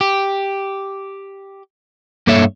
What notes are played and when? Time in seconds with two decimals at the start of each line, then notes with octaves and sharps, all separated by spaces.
0.01 G4
2.27 G2 A#3 A4 C#5 E5